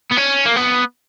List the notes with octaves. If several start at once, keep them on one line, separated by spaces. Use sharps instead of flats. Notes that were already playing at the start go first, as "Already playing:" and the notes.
B3
C#4
A#3
B3